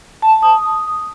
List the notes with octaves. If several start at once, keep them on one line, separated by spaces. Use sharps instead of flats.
A5
A5
D#6